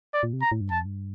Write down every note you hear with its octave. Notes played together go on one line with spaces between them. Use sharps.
D5
A#2
C3
A#5
A2
G2
F2 A5
G2